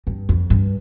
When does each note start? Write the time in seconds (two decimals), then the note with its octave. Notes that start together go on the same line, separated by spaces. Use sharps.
0.07 G2
0.29 F2
0.50 G2